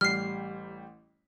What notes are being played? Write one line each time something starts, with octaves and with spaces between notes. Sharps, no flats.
A1 G3 F6 C7